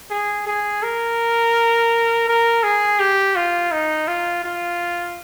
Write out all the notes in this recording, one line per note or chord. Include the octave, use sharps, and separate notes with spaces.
G#4
G#4
A#4
A#4
G#4
G4
F4
D#4
F4
F4